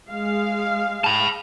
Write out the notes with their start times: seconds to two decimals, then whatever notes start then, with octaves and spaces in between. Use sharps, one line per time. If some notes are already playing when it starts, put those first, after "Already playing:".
0.11 G#3 F5
1.04 A5 B5